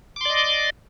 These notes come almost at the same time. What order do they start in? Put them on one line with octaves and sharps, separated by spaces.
D6 C6 D5 D#5